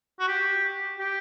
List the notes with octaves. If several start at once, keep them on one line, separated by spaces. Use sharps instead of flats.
F#4
G4
G4